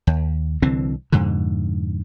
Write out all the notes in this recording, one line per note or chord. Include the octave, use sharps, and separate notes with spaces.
D#2
C2 D3 E3 C4
F2 G#2 B2 D3